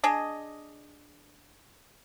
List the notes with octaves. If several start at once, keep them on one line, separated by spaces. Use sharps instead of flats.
D4 G#4 D#5